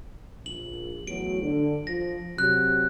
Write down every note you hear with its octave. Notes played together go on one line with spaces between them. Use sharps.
A#1 F#7
E2 A2 F#3 D7
D3
F3 A#6
C3 F#3 F#6